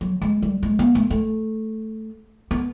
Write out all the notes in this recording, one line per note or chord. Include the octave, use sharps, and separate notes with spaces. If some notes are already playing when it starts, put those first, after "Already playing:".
F#3
G#3
G3
G#3
B3
A3
A3
B3